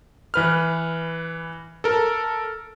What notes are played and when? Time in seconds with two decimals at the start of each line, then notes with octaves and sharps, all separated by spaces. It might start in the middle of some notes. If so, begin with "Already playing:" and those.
0.34 E3 B4 F6
1.84 A4 A#4